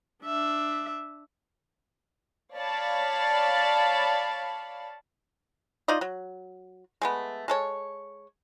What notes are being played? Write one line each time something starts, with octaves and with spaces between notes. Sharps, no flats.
D4 E5
C#5 D5 F5 A5 B5
D#4 F4 D5 D#5
F#3
G#3 A3 B3
G#3 A4 C#5